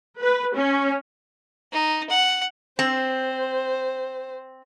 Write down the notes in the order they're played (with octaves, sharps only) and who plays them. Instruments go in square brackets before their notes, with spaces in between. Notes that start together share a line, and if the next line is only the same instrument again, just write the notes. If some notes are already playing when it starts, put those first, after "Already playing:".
[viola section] B4
C#4
[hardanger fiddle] D#4
F#5
[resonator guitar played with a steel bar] C4 [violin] C5